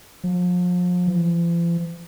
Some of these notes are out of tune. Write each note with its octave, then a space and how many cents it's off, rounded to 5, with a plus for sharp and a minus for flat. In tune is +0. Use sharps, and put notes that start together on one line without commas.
F3 +35
F3 -45